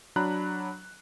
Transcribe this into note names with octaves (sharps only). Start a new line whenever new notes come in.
F#3 D4 A#5 B5 F#6